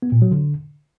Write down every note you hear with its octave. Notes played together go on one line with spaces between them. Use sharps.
B3
A#2
F#3
D3